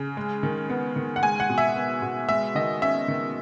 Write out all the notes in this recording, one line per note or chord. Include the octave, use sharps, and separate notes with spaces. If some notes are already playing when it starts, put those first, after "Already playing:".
Already playing: C#3
G#3
D#3
B3
D#3
F#5
G#3 G#5
F#5
B2
E5
B3
B2
G#3 E5
D#3 D#5
C#4 E5
D#3